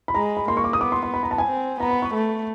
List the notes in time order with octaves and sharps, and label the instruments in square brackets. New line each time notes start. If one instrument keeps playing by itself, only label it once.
[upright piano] B5
[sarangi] G#3 [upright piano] A#5
[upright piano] B5
[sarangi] A#3 [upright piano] C6
[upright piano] C#6
D6
D#6
[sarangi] B3 [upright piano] D6
[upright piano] C6
C6
B5
A#5
A5
G#5
[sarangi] C4
[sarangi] B3 [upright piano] A#5
[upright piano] B5
C#6
[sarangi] A3